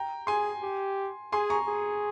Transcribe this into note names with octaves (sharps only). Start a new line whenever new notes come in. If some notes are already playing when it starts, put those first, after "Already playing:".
Already playing: G5 A#5
G#4 G#5 C6
G4
G#4 G#5 C6
A#5 C#6
G#4